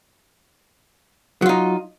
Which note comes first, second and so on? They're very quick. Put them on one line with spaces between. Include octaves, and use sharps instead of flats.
F#3 F4 D#4